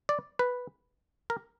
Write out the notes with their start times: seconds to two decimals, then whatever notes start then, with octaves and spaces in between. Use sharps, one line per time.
0.09 D5
0.39 B4
1.30 A#4